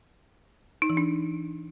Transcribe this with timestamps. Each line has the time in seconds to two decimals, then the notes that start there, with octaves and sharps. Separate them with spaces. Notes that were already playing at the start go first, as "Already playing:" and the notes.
0.82 D#4
0.90 E3
0.97 D4